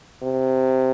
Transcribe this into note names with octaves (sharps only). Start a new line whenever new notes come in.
C3